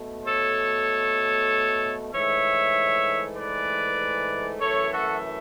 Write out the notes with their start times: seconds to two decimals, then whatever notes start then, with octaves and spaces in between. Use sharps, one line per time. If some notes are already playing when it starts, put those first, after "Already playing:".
Already playing: B2 A3
0.25 A4 C#5
2.11 G#2 E3 A3 C#5 E5
3.36 B4 D5
4.60 F#2 E3 A3 A4 C#5
4.91 F#4 A4